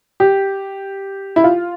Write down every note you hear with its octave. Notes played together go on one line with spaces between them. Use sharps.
G4
E4
F4